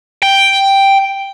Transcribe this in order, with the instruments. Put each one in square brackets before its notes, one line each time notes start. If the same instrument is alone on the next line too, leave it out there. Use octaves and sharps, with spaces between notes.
[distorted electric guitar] G5